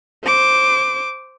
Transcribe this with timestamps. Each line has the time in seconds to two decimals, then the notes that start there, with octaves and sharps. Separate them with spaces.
0.24 C5 D6